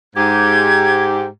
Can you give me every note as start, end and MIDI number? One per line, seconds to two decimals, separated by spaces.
0.16 1.27 44
0.16 1.27 67
0.16 1.03 92